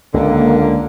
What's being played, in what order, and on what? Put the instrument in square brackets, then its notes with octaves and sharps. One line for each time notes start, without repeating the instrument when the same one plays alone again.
[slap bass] C#2 [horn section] D3 [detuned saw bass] A#3